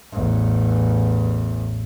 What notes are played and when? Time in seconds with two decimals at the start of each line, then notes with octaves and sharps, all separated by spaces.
0.13 A1 E2